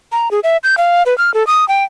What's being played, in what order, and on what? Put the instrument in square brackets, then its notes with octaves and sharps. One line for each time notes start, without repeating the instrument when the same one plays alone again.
[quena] A#5
G#4
E5
G6
F5
B4
F6
A4
D#6
G5